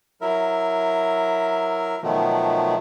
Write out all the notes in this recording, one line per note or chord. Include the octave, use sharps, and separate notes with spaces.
F#3 E4 A#4 E5
B2 D#3 F3 F#3 A3